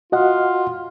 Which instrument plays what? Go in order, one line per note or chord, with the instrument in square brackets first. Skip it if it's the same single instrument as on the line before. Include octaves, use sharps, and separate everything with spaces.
[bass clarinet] F4 [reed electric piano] F#4 D#5 F#5